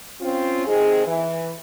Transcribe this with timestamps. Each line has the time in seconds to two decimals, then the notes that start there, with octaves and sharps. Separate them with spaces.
0.21 C4 C#4 F4
0.66 C3 D#3 G#3 C4 G#4
1.06 E3